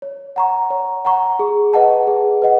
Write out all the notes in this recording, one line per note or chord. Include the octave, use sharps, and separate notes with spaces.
C#5
F#5 A#5 C#6
C#5
F#5 A#5 C#6
G#4
B4 D#5 F#5 A5
G#4
B4 D#5 F#5